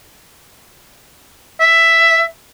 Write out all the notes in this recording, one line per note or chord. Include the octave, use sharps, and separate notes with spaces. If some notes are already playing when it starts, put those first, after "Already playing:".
E5